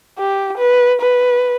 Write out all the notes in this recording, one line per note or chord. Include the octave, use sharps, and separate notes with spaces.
G4
B4
B4